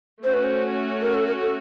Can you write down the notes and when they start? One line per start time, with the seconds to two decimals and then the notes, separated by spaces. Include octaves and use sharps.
0.23 A3 C#4 F#4 C5
0.34 B4
0.44 C5
1.02 A#4
1.14 A4
1.27 A#4
1.42 A4